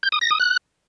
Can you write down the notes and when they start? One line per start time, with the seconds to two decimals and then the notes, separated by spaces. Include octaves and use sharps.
0.03 G6
0.12 D#6
0.21 A#6
0.31 D#6
0.40 F#6